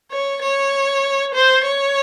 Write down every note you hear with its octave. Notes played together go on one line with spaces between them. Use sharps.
C#5
C#5
C5
C#5